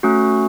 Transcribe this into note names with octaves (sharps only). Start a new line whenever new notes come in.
A3 C#4 F#4